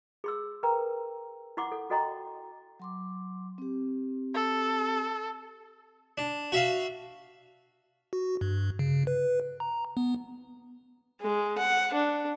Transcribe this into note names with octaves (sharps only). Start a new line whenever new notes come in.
G#4 C6 E6
A#4 B4 G5 A#5
E4 F#5 C6 D6
A4
F#4 A4 D#5 G5 A#5 C6
F#3 C6 D6
C4 G4
A4
D4
F#4 E5 F5
F#4
G2
C#3
B4
A#5
B3
G#3
F#5
D4